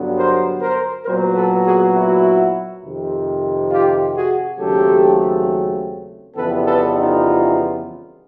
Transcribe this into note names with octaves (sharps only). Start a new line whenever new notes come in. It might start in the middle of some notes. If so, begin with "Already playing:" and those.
Already playing: G2 D3 F#3 B3
A#4 C5
A#4 C5
A#2 F#3 B3 A#4 C5
A4 B4
F#4 G#4
E4 F#4
F2 C3 D#3
F4 G4
F#4 G#4
D#2 C#3 F#3 A3 C4 G4 A4
F2 C#3 E3 G3 B3 A4 B4
A4 B4
D#4 F4